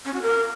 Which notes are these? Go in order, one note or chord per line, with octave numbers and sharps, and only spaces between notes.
C#4
F#4
A#4